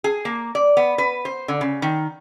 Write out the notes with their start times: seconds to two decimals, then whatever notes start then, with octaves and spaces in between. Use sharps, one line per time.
0.04 G#4
0.25 A#3
0.55 D5
0.77 B3
0.98 B4
1.25 C5
1.48 D3
1.61 C#3
1.82 D#3